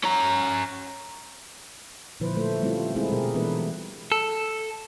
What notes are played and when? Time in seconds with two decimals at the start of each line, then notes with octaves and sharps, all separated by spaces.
0.04 C#4 A#5
2.20 A#2 D3 F3 E4 B4 C5
2.36 A3 C5
2.62 G3 A3 C4 C#4 E4 F4
2.95 G#3 A3 C4 D#4 E4 G#4
3.12 B2 F#3 G4 G#4 A#4
3.34 E3 G3 A3 B3 D4 B4
4.12 A4